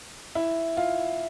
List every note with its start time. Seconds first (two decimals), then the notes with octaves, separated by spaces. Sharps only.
0.35 E4
0.77 F4